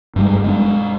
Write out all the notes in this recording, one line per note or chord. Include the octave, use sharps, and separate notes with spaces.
G2 G3 G#3
G#3 A#3 D4